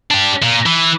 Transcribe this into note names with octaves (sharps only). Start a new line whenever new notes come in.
D4 G4
A#2
E3